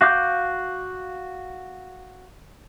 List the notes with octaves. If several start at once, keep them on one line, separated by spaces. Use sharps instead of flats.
F#4 F5 D6 G6